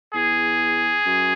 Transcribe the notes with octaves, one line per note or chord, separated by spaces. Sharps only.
E2 G#4
F#2